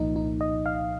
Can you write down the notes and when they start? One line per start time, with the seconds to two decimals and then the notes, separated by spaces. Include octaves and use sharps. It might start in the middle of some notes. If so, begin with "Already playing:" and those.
Already playing: C2 A#2 F3 A#3 D#4
0.16 D#4
0.41 D#5
0.66 F5